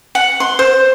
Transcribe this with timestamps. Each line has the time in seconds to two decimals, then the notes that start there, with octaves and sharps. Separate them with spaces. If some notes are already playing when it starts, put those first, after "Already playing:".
0.15 F#5
0.40 C6
0.59 C5